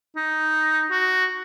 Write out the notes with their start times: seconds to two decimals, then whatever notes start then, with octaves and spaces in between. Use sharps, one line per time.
0.16 D#4
0.91 F#4